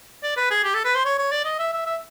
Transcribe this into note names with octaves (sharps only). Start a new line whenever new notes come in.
D5
B4
G#4
G4
A4
B4
C5
C#5
C#5
D5
D#5
E5
E5
E5